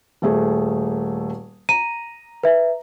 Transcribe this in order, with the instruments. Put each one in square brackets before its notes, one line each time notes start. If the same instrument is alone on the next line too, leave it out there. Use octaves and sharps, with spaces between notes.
[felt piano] D#1 A3 G#4
[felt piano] A#5 [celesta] D#7
[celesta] B4 E5